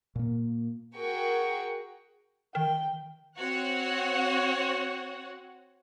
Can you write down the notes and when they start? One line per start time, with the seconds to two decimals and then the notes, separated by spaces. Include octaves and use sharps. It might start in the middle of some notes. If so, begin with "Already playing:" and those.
0.15 A#2 A#3
0.96 F#4 G#4 A#4 F#5 G5 C#6
2.55 D#3 G5
3.37 C4 F#4 C#5 F#5